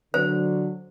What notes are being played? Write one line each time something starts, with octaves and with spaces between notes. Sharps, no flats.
D3 F#3 C5